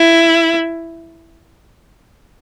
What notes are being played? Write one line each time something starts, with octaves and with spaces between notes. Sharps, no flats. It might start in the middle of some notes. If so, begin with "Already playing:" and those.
Already playing: E4